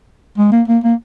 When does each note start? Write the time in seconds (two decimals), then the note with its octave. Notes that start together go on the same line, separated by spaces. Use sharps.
0.38 G#3
0.52 A#3
0.68 A#3
0.84 A#3